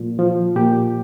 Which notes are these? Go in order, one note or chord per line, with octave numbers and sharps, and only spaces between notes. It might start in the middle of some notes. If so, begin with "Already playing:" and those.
Already playing: A#2 F3
F3
A#2 G4